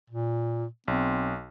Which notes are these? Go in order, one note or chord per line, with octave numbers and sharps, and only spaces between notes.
A#2
B1 C4